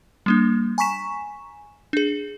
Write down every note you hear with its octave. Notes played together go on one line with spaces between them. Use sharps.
G3 A#3 D4
G#5 A#5 C#6 B6 E7
D4 G#4